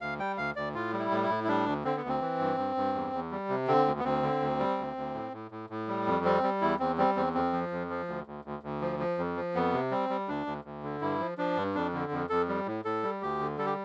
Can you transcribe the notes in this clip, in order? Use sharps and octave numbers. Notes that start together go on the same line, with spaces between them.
D2 F5
G3 G5
D2 F5
D2 D5
A2 F4
G3
E4
A2
E4
A2
E4
G3 D4
D2
D3 C4
B3
D2
C4
E3
G2
G2
G2
E2
E2
G3
C3
D3 C4
D2
B3
D2 C4
D3
D2
G3
D2
D2
A2
A2
A2
A2
G3
F2
G3 C4
G3
E2 E4
E2 C4
G3 C4
E2 C4
F2 C4
F3
F2
F3
D2
D2
D2
D2
F3
F3
F2
F3
F2 B3
C3
G3 C4
G3
D2 D4
D2
D2
D3
G2 E4
F3
F3 D4
G2
F2 D4
D3
F2
F2 A4
G3
A2
A2 A4
G3
D2 G4
D3
G3 A4
G4